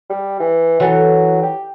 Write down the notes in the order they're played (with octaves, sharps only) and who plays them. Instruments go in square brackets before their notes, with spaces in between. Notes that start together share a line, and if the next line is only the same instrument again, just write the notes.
[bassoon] G3
E3
[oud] E3 A4 C#5 [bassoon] F#3
[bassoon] G4